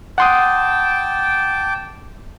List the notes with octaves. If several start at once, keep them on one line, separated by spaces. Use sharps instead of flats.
F#5 G5 A5 C6 D6 D#6